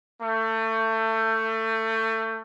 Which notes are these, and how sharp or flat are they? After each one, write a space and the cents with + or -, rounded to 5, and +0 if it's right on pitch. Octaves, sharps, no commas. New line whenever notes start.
A3 +25